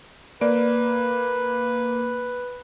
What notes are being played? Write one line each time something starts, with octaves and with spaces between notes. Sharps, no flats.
A#3 B4 D5